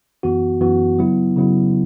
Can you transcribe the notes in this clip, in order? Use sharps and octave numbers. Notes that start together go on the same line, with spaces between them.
F#2 E3 B3 F#4
F#2 E3 B3 F#4
C#3 F#3 B3 E4
C#3 F#3 B3 E4